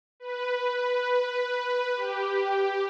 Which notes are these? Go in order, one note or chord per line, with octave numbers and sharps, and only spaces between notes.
B4
G4